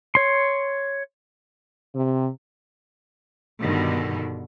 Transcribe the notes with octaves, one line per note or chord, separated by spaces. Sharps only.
C#5 C6
C3
G2 B2 D3 D#3